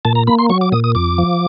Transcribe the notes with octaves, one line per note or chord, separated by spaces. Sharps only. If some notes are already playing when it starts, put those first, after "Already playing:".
A#2 A5
A#5
A#3 B5
C6
F#3 C#6
D6
A#2 D#6
D#6
F2 D6
F3